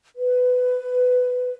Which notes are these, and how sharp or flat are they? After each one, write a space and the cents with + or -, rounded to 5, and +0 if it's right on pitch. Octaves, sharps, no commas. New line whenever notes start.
B4 +15